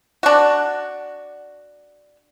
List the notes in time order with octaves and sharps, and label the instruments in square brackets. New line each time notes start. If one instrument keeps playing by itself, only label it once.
[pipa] D4 F#4